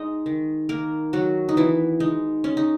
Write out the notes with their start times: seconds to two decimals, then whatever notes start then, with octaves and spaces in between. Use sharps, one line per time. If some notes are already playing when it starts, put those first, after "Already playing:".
Already playing: G#3 D#4 D#5
0.26 D#3
0.69 D#3 A#3 A#4
1.13 D#3 F#3 F#4
1.49 D#4
1.57 E3 B3 E4
2.00 G#3 D#4
2.44 G#3 C#4
2.57 D#4